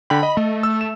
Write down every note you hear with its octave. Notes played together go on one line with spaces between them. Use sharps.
D3 G5 B5
D#5
A3
E6
E7